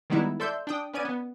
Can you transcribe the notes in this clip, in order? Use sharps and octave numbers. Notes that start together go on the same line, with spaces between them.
D#3 G3 G#3 B3 D#4 E4
A4 D5 E5 C6 E6 G6
D4 G5 D#6
B3 C#4 D5 G#6 D#7
B3